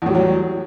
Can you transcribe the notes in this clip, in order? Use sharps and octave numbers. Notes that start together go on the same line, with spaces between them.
E2 A2 F#3 G3